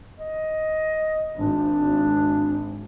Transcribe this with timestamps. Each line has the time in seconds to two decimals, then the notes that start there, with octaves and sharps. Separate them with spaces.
0.19 D#5
1.37 G#1 D4